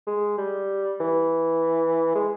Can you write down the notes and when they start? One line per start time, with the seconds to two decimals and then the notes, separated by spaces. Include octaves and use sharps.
0.07 G#3
0.38 G3
1.01 E3
2.15 G#3